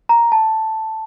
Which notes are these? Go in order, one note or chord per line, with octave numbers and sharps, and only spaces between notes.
A#5
A5